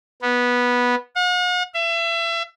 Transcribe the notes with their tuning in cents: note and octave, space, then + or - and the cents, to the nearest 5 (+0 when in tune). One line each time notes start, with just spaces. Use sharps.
B3 -10
F#5 -45
E5 +30